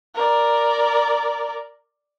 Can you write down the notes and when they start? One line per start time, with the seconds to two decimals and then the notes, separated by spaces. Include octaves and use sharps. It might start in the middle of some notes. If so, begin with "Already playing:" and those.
0.15 A#4 D5